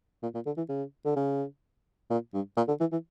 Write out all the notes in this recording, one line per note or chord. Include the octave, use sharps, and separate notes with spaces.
A#2
A#2
D3
E3
C#3
D3
C#3
A#2
G2
A#2
D3
E3
E3